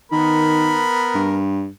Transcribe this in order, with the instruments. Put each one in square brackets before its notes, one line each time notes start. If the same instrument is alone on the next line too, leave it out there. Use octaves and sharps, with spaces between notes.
[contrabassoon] D#3 [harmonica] B3 A#4 B5
[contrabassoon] G2